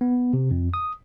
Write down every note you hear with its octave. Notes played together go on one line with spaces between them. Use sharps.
B3
C3
F2
D#6